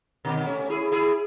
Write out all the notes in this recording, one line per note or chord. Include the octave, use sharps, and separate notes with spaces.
B2 D#3
A3 C#4
E4 G#4
E4 G#4